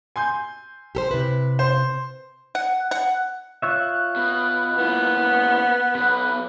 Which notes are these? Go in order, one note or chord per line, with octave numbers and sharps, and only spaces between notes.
G#5 C6 G6
G4 A4 C5
C3 E4 B4
C5
F#5
F#5
F4 C#5 E5 F#6
B2
A#2 E3 B3
B1 B2 B4